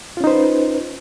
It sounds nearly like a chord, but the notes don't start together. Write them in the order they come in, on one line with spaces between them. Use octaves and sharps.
F4 C#4 D#4 C5 B4